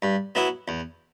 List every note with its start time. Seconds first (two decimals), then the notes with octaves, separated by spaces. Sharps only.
0.02 G2
0.35 F#3 B3 E4
0.68 E2